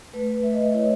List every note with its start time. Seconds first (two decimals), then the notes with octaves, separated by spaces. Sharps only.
0.14 A3 B4
0.43 A3 E5
0.53 D#5
0.62 E5
0.74 E4 C#5